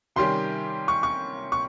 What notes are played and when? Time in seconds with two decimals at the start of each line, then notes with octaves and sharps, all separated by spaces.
0.16 C3 D#3 G3 C#4 G4 C6
0.88 C#6
1.03 C#6
1.52 C#6